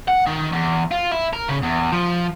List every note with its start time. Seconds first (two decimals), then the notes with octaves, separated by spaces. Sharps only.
0.08 F#5
0.26 D#3
0.53 E2
0.92 F4
1.12 E4
1.33 A#4
1.48 C#3
1.62 E2
1.92 F3